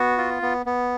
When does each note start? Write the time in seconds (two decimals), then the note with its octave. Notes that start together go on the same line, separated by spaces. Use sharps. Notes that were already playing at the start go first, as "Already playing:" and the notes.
Already playing: B3 F#4
0.18 F4
0.43 B3
0.66 B3